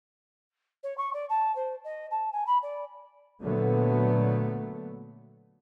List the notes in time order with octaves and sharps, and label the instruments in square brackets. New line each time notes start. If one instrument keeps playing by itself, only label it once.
[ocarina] C#5
C#6
D5
A5
C5
D#5
A5
G#5
B5
D5
[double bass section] A#2 D3 F#3 A3 B3